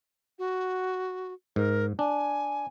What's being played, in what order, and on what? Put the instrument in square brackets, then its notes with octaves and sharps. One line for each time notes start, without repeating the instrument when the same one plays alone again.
[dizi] F#4
[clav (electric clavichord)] G#2 [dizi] A#4
[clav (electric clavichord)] D4 [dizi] G#5